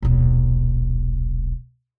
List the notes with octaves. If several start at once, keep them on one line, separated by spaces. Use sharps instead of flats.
D#1 B1